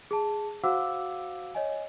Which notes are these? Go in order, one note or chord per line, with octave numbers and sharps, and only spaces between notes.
G#4 A5
F#4 C5 F5 F#5 D6 E6
C#5 D#5 G#5